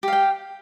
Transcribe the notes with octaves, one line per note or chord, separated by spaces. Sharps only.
G4 F5 G5